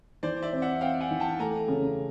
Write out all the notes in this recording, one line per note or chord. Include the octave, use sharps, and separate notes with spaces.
E3 C5 D5
D5 E5
C4
E5 F#5
C4 F5 G5
F#5 G#5
E3
G5 A5
A3 G#5 A#5
C#3